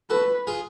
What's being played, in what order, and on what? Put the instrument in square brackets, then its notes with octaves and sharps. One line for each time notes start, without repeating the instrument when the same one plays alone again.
[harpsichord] F#4 A4 [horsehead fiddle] B4
[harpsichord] F4 G#4